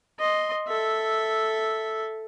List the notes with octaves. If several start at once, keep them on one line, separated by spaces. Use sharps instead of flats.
D#5 C6
A4 E5